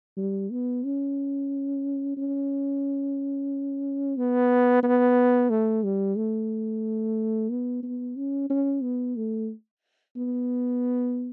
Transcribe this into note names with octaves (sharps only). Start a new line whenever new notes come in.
G3
B3
C#4
C#4
B3
B3
A3
G3
A3
B3
B3
C#4
C#4
B3
A3
B3